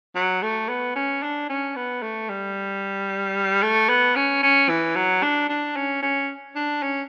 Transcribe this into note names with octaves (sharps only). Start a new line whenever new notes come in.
F#3
A3
B3
C#4
D4
C#4
B3
A3
G3
A3
B3
C#4
C#4
E3
F#3
D4
D4
C#4
C#4
D4
C#4